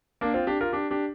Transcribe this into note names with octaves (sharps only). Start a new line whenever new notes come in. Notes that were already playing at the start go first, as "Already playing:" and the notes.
A#3 D4
C4 F4
D4 G4
F4 A#4
D4 G4
D4 G4